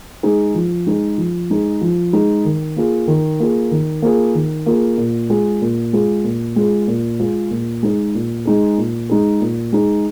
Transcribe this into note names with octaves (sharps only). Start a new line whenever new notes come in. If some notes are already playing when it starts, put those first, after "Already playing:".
G#3 D#4 G#4
F3
G#3 D#4 G#4
F3
G#3 D#4 G#4
F3
G#3 D#4 G#4
D#3
A#3 F4 G#4
D#3
A#3 F4 G#4
D#3
A#3 F4 G#4
D#3
A#3 F4 G#4
A#2
G#3 F4 G#4
A#2
G#3 F4 G#4
A#2
G#3 F4 G#4
A#2
G#3 F4 G#4
A#2
G#3 D#4 G#4
A#2
G#3 D#4 G#4
A#2
G#3 D#4 G#4
A#2
G#3 D#4 G#4